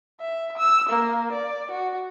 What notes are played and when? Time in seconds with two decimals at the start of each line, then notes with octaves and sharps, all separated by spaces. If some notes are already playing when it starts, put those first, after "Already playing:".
0.21 E5
0.58 E6
0.89 A#3
1.32 D5
1.71 F#4